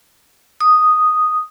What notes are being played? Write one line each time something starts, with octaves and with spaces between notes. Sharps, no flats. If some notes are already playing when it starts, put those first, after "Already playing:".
D#6